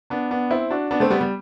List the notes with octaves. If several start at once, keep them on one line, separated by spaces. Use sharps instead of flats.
B3 D4
B3 D4
C4 E4
D4 F#4
B3 D4
A3 C4
G3 B3
G3